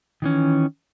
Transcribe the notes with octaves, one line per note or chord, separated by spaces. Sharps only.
D#3 E3 C#4